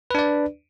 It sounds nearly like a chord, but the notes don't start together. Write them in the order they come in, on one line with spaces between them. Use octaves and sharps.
B4 D4 D5